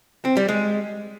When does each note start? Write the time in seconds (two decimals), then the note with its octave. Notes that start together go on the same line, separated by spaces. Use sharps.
0.25 C4
0.37 G3
0.48 G#3